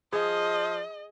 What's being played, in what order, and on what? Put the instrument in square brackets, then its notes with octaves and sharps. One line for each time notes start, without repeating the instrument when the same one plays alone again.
[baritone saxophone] F3 [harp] G#4 [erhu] D#5